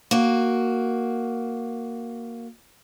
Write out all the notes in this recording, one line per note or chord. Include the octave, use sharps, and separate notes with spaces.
A#3 F#4